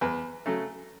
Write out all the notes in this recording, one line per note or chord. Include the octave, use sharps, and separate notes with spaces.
E2 B4
C#3 F#3 A3